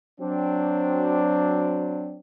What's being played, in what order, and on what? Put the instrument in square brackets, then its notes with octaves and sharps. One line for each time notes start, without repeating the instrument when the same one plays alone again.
[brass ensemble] F#3 C4 D4